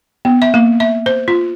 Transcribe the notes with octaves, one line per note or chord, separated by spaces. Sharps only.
B3
E5
A#3
E5
C5
F4